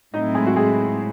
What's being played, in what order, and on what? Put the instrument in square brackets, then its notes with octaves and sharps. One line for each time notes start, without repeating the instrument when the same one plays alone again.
[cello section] A2 F#3 C4 E4 [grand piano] D#4 D#5
[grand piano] G#3 G#4
F#4
G#3 G#4